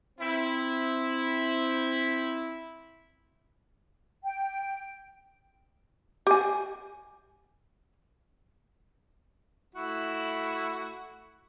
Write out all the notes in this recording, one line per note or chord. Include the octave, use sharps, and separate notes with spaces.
C4 E4
G5
G4 G#5
A3 E4 F#4